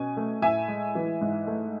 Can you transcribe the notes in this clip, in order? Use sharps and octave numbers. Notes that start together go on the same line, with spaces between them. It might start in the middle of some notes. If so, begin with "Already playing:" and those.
Already playing: B2 C#4 G#5
A3
A2 E5 G#5
G#3
E3
G#2
A3